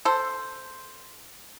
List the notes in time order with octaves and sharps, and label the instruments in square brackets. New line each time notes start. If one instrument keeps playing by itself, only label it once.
[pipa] A4 C5